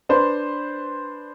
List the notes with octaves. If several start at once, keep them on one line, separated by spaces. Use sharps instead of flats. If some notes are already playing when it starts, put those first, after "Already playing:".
D4 B4 C5